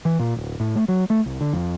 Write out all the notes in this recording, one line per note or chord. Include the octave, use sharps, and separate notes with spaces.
E3
A#2
D1
A2
A3
F#3
A3
C2
D3
F2